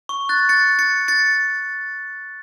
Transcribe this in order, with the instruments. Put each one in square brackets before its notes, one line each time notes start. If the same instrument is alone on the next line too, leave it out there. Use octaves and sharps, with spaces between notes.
[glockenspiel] C#6
F#6 A6
A6 C#7
A6 C#7
A6 C#7